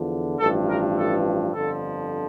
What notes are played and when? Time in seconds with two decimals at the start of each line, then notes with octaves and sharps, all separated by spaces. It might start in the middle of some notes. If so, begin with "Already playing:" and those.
Already playing: E2 D3 F3
0.39 A1 G2 F3 A4
0.69 A#4
0.97 A4
1.53 G1 F2 D3 F3 A4